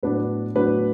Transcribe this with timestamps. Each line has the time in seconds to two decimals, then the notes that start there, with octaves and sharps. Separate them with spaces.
0.03 A2 F#3 B3 D4 B4
0.55 A2 F#3 B3 D4 B4